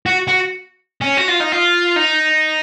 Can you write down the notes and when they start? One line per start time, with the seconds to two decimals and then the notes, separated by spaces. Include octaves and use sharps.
0.06 F#4
0.28 F#4
1.02 C#4
1.18 F#4
1.29 F4
1.40 D#4
1.52 F4
1.96 D#4